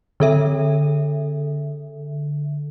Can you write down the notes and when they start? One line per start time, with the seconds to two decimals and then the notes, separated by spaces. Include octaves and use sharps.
0.20 D3 A4 E5